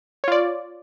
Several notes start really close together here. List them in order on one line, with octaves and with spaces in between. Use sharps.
C#5 F4 D5